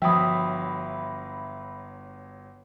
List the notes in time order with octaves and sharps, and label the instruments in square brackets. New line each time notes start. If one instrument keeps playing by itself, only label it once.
[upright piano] G1 F#3 [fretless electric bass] F3 [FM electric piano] E5 B5 [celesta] G5 D#6